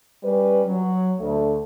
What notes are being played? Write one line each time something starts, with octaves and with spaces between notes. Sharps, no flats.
G3 C#4 B4
F#3
D2 A3